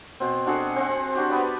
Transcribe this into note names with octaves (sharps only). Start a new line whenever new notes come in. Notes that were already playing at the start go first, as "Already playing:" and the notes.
B2 C4
D4 F#4 G#4 A4
C4 F#5
D4 F#4 G4
B3 B4 D5